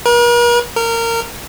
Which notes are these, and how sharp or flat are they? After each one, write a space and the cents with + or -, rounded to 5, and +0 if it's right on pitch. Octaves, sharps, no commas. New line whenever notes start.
A#4 +45
A#4 -20